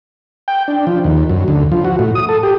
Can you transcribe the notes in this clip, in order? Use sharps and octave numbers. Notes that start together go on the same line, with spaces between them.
G5
D4
F3
D#2
F#2
D2
F3
F#4
A2
D#6
A4
G4